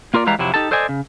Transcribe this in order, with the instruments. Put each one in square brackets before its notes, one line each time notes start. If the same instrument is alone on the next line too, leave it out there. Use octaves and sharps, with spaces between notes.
[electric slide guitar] A#3 F4 A#4 D5
E3 G3 G#3 B4 F5 A#5
F2 C3 F#3 E4
D#4 G4 A4 A5
A4 C5 D5 D#5 G#5
C#3